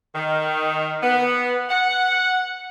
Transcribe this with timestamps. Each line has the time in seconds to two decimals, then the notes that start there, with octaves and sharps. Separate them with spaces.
0.15 D#3
1.03 B3
1.70 F#5